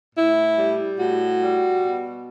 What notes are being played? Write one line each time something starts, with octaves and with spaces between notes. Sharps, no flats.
A2 E4
G3
A2 F#4
G3
B2